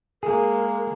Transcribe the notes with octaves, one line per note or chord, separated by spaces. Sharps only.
G#3 A#3 G#4 A#4